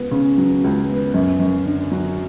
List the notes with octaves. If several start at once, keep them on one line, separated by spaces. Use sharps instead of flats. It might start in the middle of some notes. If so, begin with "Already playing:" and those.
Already playing: C#2 B3
C#3
F#3
C#2
B3
F#2
F#2
D3
F#3